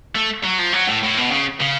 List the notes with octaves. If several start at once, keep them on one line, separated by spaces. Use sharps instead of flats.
A3
F#3
F3
F#3
A2
A2
B2
C#3
C#3